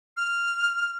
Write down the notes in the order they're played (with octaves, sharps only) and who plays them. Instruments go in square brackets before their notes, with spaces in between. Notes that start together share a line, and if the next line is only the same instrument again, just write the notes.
[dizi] F6